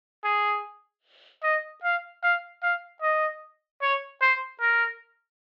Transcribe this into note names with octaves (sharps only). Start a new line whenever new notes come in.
G#4
D#5
F5
F5
F5
D#5
C#5
C5
A#4